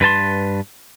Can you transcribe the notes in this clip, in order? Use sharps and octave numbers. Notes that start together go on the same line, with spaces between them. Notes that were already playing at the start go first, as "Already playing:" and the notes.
G2 B4 A5 C6